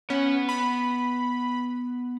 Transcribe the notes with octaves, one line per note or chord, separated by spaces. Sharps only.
B3 C#4 F#5
B5